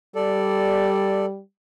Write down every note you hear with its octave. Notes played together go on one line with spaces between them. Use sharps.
G3 A4 D5